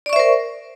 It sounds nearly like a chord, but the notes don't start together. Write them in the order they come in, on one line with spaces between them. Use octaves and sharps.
D5 C#6 E5 C5 A#4